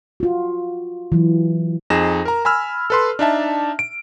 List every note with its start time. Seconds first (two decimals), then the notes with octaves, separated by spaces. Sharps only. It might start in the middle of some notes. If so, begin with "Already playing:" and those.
0.20 F4 F#4
1.12 E3 F#3
1.90 F2 D#4 G#4 A#6 E7
2.25 A#4 A#5
2.45 G#5 B5 E6 F6
2.90 A4 B4 C6
3.19 D4 D#4 E5 A5
3.79 D7